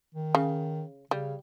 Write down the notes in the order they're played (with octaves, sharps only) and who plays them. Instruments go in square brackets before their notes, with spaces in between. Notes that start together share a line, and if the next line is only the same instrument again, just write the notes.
[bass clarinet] D#3
[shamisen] C#3
[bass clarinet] C#3 [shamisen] G3